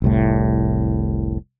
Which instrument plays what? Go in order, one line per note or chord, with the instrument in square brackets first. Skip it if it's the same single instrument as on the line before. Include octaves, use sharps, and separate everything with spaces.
[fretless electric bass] F1 C2 A2